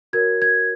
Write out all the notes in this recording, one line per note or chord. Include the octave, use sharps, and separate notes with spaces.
F#4 A#4 C#5 G#6
G#6